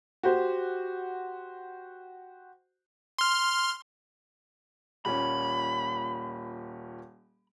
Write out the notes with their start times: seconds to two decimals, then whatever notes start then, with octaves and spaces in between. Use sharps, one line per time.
0.23 F#4 G4 C5
3.19 C6 F6
5.05 D#1 A#2 C#4 B5